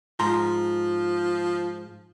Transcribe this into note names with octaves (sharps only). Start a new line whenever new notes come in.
G#2 F3 A#5 C6